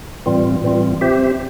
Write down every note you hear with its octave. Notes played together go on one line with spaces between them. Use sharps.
A2 E3 G3 C4 F4
A2 E3 G3 C4 F4
C4 G4 C5 E5